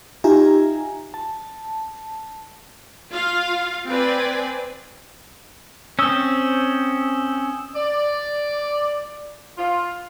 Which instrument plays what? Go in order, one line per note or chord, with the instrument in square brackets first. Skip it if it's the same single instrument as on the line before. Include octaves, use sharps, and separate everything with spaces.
[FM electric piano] D#4 F4 G4 E5 G#5 A#5
A5
[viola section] F4 F5
C4 B4 D5 G#5
[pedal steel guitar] C4 C#4 [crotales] D#6 E6 E7
[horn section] D5
F4